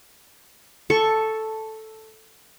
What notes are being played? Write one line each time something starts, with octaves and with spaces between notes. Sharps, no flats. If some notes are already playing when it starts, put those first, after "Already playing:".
A4 C#6